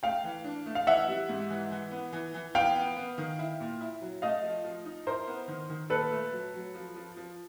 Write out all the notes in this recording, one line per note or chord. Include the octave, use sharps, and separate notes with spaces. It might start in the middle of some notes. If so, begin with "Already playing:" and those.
A3 F5 G5
E3
D4
A3
F5
E3 E5 F#5
G3
G#2
E3
E3
B3
E3
E3
B3 F5 G5
B3
B3
D#3
E4
A#2
E4
F#3
A3 D#5 F5
F3
F3
D#4
E4 A#4 C5
B3
D#3
D#3
A#2 A4 B4
A3
F#3
F#3
F3
F3
F3